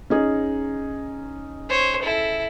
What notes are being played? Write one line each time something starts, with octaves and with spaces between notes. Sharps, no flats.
C#4 D#4 G#4
C5 C#5
E4 A4